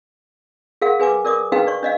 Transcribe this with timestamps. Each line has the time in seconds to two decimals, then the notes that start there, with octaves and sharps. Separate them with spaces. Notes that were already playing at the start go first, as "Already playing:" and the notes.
0.82 G#4 A#4 F5 F#5
0.99 G#4 B4 G#5 D6
1.25 A#4 D5 D6 D#6
1.52 D4 D#4 G#4 B4 F5 G5
1.67 D5 C#6
1.83 D4 D#5 F5